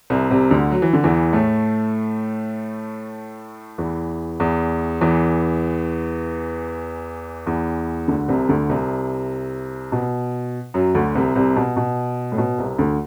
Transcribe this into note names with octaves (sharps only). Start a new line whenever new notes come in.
C2 C3
C2 C3
D2 D3
F#3
E3
D3
E2 E3
A2 A3
E2 E3
E2 E3
E2 E3
E2 E3
D2 D3
C2 C3
D2 D3
C2 C3
B2
F#2 F#3
D2 D3
C2 C3
C2 C3
B2
B2
A2
B2
C2 C3
D2 D3